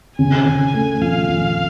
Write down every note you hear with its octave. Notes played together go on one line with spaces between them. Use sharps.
C#3 G#5
C#3
A3
F3 F5
F3